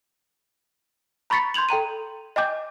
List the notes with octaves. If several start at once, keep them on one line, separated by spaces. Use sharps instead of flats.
A#5 B5 C#6 A6 B6 C#7
C6 G6 G#6 F7 F#7
A4 G5 A#5 D#7
D#5 G5 G#5 D6 G6